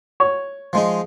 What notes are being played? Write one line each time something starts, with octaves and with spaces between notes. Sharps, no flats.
C#5
F3 G#3 D#4